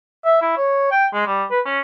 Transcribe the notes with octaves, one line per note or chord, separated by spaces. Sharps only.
E5
E4
C#5
G5
G#3
G3
B4
C#4